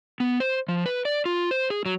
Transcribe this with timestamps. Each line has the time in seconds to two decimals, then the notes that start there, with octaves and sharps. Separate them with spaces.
0.20 B3
0.40 C5
0.68 F3
0.86 B4
1.05 D5
1.26 F4
1.51 C5
1.70 G#4
1.86 F#3